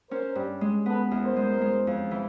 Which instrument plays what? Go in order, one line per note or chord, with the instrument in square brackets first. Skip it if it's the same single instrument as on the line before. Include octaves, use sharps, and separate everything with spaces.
[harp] C#4 [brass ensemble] A#4 C5
[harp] G2
G#3
[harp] B3 [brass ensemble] A4 B4
[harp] E2
[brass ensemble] A#4 C5
[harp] G#3
G#3
F2
E3